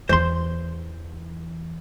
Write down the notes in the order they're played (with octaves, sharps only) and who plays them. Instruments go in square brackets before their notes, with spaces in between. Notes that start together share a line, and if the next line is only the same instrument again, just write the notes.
[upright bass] E2 E3 [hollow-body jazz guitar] C5 C6